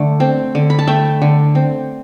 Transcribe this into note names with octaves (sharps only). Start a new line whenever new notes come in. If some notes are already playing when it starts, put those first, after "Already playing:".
Already playing: D3 A3
C4
D3
B5
A5
A3 E5 G5
D3
C4